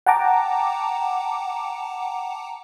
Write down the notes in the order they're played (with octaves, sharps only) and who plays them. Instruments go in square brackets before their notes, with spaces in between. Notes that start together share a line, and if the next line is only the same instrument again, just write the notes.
[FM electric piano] F#5 G5 A5 A#5 D6